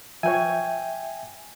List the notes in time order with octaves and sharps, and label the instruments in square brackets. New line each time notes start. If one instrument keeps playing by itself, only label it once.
[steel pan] F3 B4 C#5 [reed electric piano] E5 G5 [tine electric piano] G#5